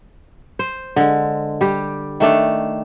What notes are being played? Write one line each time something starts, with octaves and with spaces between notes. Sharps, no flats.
C5
D3 G#3
G3 G4
D#3 A3 D4